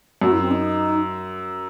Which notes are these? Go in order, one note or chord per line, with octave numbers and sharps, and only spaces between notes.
F#2 F#4
E4
C4
D#4